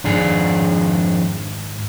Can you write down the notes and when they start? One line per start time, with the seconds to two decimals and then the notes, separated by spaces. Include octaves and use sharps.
0.04 F2 G#2 D#3 D4 G#4